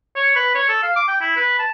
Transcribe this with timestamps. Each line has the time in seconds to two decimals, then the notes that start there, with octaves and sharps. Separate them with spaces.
0.16 C#5
0.36 B4
0.55 C#5
0.69 A4
0.83 F5
0.96 D6
1.08 G5
1.21 E4
1.36 B4
1.59 A5